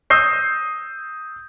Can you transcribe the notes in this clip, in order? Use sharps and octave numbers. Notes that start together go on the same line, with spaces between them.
D#6 E6 G6 A#6 C7